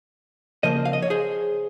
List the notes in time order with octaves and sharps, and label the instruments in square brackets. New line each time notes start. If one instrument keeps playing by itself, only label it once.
[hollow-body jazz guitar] C#3 F3 A#3 C5 D#5
F5
D#5
C#5
G#4 C5